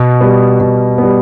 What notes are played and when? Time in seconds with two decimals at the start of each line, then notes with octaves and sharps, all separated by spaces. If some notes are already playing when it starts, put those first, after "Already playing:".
Already playing: B2
0.21 G3 B3
0.60 B2
0.98 G3 B3